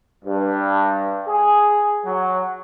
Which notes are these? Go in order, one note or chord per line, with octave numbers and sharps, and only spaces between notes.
G2
G#4
F#3